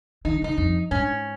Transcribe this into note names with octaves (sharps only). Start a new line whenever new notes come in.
D#3 D#4
C#3 D#4
F2
G#2 C#4